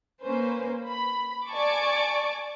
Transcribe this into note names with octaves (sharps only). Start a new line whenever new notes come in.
A#3 C#4 B4 C5
B5
D5 G#5 A5 C#6 D6